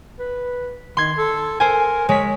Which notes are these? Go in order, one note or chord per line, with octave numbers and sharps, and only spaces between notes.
B4
D#3 C6 G#6
A4
A#4 C5 G#5
G#3 C#5 B6